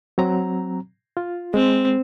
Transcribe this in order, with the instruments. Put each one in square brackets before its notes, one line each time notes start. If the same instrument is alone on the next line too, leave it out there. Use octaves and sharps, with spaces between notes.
[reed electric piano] F#3 C4 A#5
F4
[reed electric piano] G#3 [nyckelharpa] C4